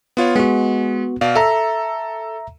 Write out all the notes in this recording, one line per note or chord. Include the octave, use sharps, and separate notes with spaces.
B3 F4 C#5
G#3 B3 F#4
B2 D5 F5
A4 E5 A#5